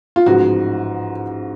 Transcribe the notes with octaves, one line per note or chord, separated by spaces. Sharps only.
F4
A1 G#2 F3 F#4